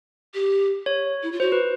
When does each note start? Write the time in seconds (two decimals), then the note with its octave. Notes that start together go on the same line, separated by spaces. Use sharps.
0.34 G4
0.86 C#5
1.23 E4
1.32 F4
1.40 F#4 C5
1.52 B4